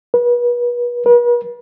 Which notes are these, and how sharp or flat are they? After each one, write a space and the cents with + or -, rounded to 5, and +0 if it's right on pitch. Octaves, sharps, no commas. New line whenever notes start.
B4 -35
B4 -45